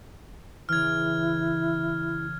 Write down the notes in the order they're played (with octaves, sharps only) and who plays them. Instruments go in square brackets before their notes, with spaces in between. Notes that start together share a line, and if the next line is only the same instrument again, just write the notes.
[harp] C#3 E3 [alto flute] E4 [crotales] F6 G#6